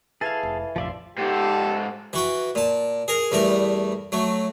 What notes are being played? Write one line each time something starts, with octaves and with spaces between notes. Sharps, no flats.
E3 G#4 A4 F5 G#6 A6
F1
F1 A#1 F3 D5 E5 F5 C6
G#2 F4 G4 A4
E3 F#4 G5
A#2 A5
G#4 A#4
E2 G3 A3 A#4
F#3 A3